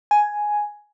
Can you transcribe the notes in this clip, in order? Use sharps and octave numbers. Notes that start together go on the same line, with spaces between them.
G#5